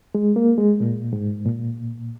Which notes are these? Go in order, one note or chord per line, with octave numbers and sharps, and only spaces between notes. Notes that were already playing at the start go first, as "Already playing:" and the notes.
G#3
A#3
G#3
A#2
G#2
A#2